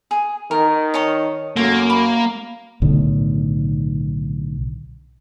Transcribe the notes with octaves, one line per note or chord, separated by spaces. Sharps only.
G#4
D#3 A#4
C#5 D#5 A5
F#2 A#3 F4 A4 C#5
B5
B1 A2 D3 D#3